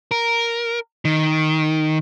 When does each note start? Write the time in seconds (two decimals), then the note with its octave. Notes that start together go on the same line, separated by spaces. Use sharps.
0.11 A#4
1.05 D#3